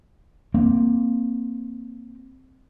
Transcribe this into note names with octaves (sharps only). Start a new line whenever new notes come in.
A#3 C4